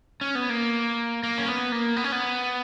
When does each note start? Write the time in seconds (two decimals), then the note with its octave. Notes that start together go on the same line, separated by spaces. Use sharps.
0.21 C#4
0.35 B3
0.49 A#3
1.23 A#3
1.38 C#4
1.48 B3
1.72 A#3
1.96 B3
2.04 C#4
2.12 B3